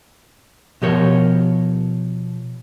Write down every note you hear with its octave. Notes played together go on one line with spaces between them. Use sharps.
B2 F3 G4 A#4 C#5